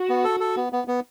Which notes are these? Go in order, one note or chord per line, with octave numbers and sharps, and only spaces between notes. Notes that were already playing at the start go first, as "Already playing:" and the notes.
Already playing: F#4
B3
A4
A4
B3
B3
B3